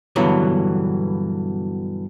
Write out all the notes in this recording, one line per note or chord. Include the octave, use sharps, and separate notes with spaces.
G2 B2 D3 E3 F#3